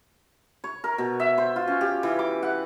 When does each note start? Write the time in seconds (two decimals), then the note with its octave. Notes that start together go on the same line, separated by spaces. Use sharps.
0.64 C#5
0.84 A#4
0.98 B2
1.20 E5
1.38 C5
1.56 F4
1.67 C#4
1.81 G4
2.03 E3
2.19 D6
2.43 F#5